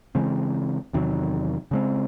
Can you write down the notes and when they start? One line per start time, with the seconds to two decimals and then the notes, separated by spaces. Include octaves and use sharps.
0.15 C#3 E3 G#3 C4
0.93 E2 C3 D#3 F#3
1.71 C#3 G#3 C4